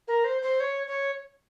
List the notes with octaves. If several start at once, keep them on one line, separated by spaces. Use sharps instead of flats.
A#4
C5
C5
C#5
C#5